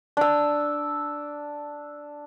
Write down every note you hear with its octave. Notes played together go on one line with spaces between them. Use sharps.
D4 E6